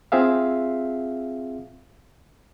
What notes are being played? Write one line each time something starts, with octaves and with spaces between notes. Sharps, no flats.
C4 F4 G#4 E5 F5